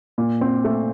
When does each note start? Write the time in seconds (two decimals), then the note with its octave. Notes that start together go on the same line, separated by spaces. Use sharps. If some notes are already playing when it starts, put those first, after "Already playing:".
0.18 A#2
0.41 C4
0.64 A3